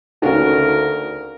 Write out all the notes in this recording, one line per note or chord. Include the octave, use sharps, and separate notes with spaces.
D2 C#3 D#4 F#4 A#4